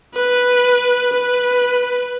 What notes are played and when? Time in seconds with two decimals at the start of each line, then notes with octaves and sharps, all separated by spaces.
0.15 B4
1.14 B4